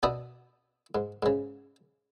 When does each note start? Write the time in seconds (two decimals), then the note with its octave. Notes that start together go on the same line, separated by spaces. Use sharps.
0.03 B2 B3 D4 D5 E5 D#6
0.95 G#2
1.23 G#2 C#3